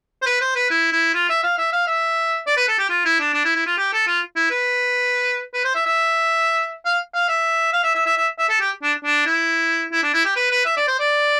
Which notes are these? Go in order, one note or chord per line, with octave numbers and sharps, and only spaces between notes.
C5
B4
C5
B4
E4
E4
F4
E5
F5
E5
F5
E5
D5
B4
A4
G4
F4
E4
D4
D4
E4
E4
F4
G4
A4
F4
E4
B4
B4
C5
E5
E5
F5
F5
E5
F5
E5
E5
E5
E5
E5
A4
G4
D4
D4
E4
E4
D4
E4
G4
B4
B4
E5
D5
C5
D5